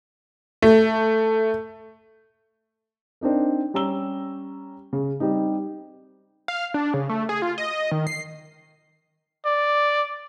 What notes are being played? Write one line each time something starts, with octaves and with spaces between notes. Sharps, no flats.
A3
C4 D4 D#4 A#4
G3 C#4 A#5 E6 G7
C#3
G3 C4 D#4
F5
D4
C#3
A3
G#4
F4
D#5
D#3
C7
D5